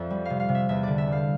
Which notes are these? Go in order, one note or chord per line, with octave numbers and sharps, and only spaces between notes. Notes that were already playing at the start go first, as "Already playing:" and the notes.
Already playing: F2 D5 E5
G3
C3 F5
F5
C3
E5
E2 E5
D3 D5
E5
G3
F5